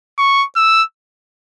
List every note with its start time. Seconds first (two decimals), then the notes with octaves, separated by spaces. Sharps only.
0.18 C#6
0.56 E6